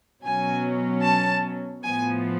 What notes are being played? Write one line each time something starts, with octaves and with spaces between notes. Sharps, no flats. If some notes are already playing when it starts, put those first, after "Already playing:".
B2 F#3 C#4 G#5
A5
A2 F3 B3 G#5